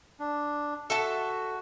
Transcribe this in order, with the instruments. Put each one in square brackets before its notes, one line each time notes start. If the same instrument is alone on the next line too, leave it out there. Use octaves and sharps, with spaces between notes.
[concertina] D4
[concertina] F#4 [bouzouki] A4 E5 A5